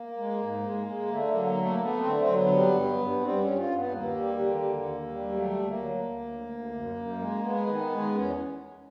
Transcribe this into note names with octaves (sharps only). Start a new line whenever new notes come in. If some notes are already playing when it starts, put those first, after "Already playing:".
Already playing: A#3
G#3
G#2
G#3
G#3
D3 A3
F#3 A#3
A#3
A3
A#3
A3 B3
C4
D3
C4
F#3
B3
G3
G2
G2
G3 C4
C#4
G2
F4
G2
B3
D#2 A#3
G3
D3
D#2
D#2
G3
F#3 A3
D2
A#3
F#3
D2
D2
D2
F#2
F#2
G#3
G#3 B3
D#3
G#3
E2 C#4